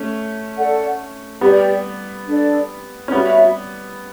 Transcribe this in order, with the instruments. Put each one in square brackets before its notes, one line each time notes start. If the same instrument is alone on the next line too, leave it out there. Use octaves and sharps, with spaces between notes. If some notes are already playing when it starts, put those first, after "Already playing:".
Already playing: [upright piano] A3 C#4
[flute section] A4 D5 F#5
[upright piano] G3 B3 [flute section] G4 B4 D5
[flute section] D4 A4 D5
[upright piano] C#4
[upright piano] G3 B3 [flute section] F#4 C#5 E5 B5